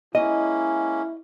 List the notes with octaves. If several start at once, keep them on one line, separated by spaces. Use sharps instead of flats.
G#3 A#3 C#4 E4 D#5